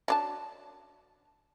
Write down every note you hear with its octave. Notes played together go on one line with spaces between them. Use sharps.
F#3 D4 A5